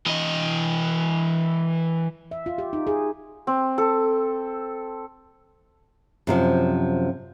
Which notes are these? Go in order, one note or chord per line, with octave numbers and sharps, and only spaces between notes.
E3 D#5
E5
F4
G4
D#4
G#4
C4
A4
F#2 C3 F3